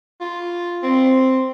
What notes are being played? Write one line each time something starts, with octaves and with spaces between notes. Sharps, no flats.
F4
C4